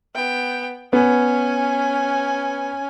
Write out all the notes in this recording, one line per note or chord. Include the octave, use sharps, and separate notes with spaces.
B3 G5
B3 C#4 G#5